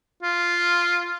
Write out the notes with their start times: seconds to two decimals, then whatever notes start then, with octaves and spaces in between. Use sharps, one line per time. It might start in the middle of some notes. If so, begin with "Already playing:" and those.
0.23 F4